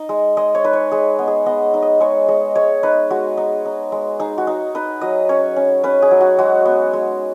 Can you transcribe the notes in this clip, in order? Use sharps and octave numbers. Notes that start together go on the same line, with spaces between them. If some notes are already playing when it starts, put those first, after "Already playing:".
Already playing: D#4 D#5
G#3
G#3 D#5
C#5
D#4 B4
C#5
G#3 G#4
B3
G#4
B3 D#5
D#4
D#5
G#3 C#5
G#3 D#5
G#3 C#5
D#4 B4
G#3 F#4
D#4
D#4
G#3
D#4 G#4
F#4
D#4
D#4 B4
F#3 D#5
C#4 C#5
C#4
C#4 B4
G#4
F#3
F#4
G#3 F#4
B3
G#3